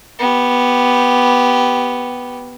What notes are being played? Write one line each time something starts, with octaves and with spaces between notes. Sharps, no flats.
B3 G4